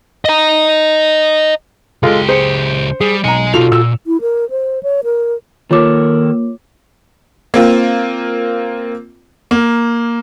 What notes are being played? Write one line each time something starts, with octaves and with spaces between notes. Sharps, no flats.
D#5 A#5
C#2 G#3 F4 G4 A4
G#4 C5 C#7
G3 G#4
B1 D#5 G#5 A#5 C#7
B2 D#4 F4 F#4 A4 F7
A#2 E6
E4
A#4
C5
C#5
A#4
D#3 A#3 F4 A4 A#4 C#5 D6
A#3 C4 F4
A#3